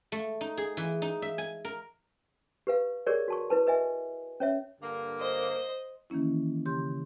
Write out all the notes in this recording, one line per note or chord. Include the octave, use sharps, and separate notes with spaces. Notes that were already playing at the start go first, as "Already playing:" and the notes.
A3
D#4
G#4
E3
D#4
E5
G#5
A#4
G4 B4 F5
G4 G#4 A#4 C#5 D5
F#4 A5 C#6
E4 B4 A5
B4 D#5 E5 G#5
C#4 C#5 E5
G2 D3 A#3
C5 D#5
D#3 E3 A#3 C#4 E4
C#3 G4 C6 G6